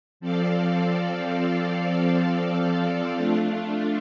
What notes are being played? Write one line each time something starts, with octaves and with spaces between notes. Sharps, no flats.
F3 C4 A4 D5 F5
A3 D4 F4